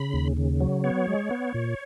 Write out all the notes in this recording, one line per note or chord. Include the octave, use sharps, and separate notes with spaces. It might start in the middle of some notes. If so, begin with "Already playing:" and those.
Already playing: C#3 B5
D#2
C#3
F#3
B3 C#5
G#3
B3
A#2